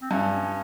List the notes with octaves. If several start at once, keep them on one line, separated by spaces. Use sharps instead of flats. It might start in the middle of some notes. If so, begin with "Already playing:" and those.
C4
G2 C#4